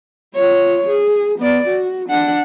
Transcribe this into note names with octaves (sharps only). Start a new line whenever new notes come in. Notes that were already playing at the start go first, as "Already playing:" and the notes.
F4 C#5
G#4
B3 D5
F#4
D4 F#5